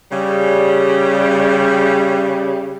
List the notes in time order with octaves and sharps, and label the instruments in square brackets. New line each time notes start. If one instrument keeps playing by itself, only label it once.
[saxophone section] C#3 G3